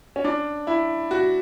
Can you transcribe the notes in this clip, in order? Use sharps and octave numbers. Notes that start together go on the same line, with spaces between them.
C#4
D4
E4
F#4